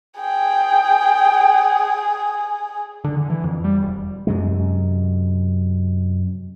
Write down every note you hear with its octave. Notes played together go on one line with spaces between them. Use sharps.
G#4 G5
D3
D3
E3
F2
G3
E1
F#2 C3 G#3